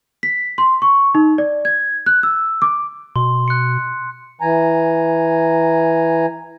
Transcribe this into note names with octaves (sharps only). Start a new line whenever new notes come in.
B6
C6
C#6
D#4
D5
G#6
F#6
E6
D6
B2 C6
F#6 C#7
E3 G#5 A#5